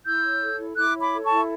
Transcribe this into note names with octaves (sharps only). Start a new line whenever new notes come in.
E4 E6 G6
C#5
A4
E4
E4 D6 F#6
C#5
B5 D6
A4
A5 C#6
E4